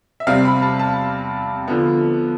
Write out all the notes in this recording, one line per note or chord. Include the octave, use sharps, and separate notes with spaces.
E5
C3 G3 C4 F5
B5
A5
A5
D3 F3 B3